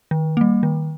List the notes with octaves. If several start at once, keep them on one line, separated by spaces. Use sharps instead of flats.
D#3
G3 A#3
D#3